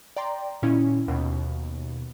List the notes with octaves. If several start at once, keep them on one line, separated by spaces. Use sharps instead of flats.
D5 G5 A#5 C6
A#2 D#3 C#4 E4
D#2 B2